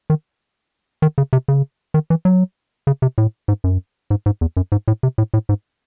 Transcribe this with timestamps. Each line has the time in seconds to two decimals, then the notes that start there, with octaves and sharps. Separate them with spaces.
0.10 D#3
1.02 D#3
1.18 C#3
1.33 C3
1.48 C#3
1.94 D#3
2.10 E3
2.25 F#3
2.87 C#3
3.02 C3
3.18 A2
3.48 G#2
3.64 F#2
4.10 G#2
4.26 G#2
4.41 E2
4.57 F#2
4.72 G#2
4.88 A2
5.03 C3
5.18 A2
5.34 A2
5.49 G#2